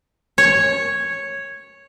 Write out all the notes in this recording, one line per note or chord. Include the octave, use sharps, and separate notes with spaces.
C#5